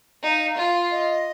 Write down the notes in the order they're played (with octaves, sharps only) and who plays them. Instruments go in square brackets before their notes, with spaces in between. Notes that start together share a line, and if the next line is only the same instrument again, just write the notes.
[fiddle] D#4 [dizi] F5
[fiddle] F4
[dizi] D#5